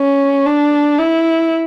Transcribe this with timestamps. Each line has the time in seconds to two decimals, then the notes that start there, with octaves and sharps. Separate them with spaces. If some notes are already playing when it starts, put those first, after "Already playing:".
Already playing: C#4
0.46 D4
0.98 E4